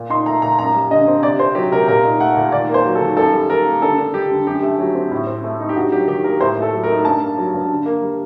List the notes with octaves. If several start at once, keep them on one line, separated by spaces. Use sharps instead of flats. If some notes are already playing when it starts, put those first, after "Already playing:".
Already playing: A#2
D#4 C6
A3 A#5
A#2 A#5
F#2 A#5
G3
D3 D#5
C4
C3 D5
C4 C5
F#3 G4
C3 A#4
A#2 A#4
D#4
A3 F#5
A#2
D#3 D5
A#3
C5
F#3
A4
D#3
F#2 A4
G3
D#3 A#4
A#3
D3 A4
D4
G3 G4
D3
F#2 G4
A3
F#3
C4
A2
C4
A3
D#4
G4
G2 F#4
F#3 G4
D#3 G4
A#3 A#4
A2 C5
A3
A4
F#3
A#4
D#4
G2 A5
A#3
F#3
G2
D3
A#3
G3